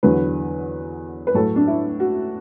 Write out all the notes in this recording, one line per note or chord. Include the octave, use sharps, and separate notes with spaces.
E2 D3 F#3 B4
B4
A2 F#3 A4
D4
E4
F#4